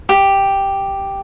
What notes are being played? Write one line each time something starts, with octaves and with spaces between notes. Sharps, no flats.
G4